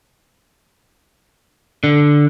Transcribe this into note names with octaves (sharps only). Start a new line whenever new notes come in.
D3